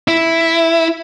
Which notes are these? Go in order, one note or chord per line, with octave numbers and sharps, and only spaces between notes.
E4